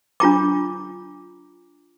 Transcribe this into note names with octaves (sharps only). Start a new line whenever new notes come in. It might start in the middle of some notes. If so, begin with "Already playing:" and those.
D4 F4 A#5 D6